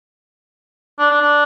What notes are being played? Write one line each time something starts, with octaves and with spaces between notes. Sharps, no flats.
D4
D4
D4